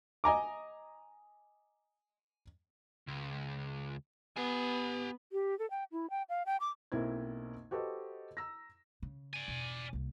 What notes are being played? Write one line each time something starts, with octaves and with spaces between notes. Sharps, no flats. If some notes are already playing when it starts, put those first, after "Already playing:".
D#5 G#5 A#5 D6
C#2
B3 G4 G#5
G4
A4
G5
E4
G5
F5
G5
D6
B1 A#3 C4 E4 C5 G#6
F#4 G4 A4 B4 C5 D#5
A#5 E6 A#6
C#3
D5 G#5
E1
C2 A#3